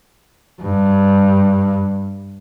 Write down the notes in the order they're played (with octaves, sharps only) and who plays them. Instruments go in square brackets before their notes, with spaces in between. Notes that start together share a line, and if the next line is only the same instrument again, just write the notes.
[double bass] G2